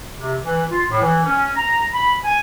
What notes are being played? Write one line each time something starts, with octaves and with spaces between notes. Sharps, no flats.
C3
E3
F4
A2
E3
C#4
A#5
B5
G#5